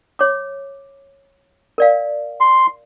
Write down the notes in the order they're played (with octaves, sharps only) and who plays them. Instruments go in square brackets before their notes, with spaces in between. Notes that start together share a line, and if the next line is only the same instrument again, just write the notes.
[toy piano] C#5 D6
A#4 D5 F5
[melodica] C6